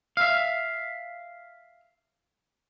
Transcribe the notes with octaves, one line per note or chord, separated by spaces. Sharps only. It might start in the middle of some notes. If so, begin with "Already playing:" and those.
E5 F5